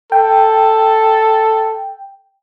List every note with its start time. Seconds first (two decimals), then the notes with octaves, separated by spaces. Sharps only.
0.12 A4 G5